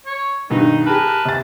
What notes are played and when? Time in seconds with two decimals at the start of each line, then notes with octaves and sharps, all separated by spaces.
0.06 C#5
0.50 G2 B2 D#3 D#4
0.86 G4 G#4 A#4 B4 A5
1.25 C3 A6